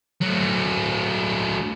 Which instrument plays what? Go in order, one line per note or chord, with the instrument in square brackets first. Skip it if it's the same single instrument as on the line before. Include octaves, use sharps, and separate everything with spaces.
[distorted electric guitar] F#3 A3